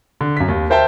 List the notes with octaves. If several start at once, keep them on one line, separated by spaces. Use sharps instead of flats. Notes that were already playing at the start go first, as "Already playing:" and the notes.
D3
F#2 B6
D#2
A#4 C5 E5 G5 A5